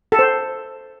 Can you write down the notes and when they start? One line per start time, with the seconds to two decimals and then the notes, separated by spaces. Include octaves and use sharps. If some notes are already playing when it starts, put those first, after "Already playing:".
0.12 A4
0.19 C5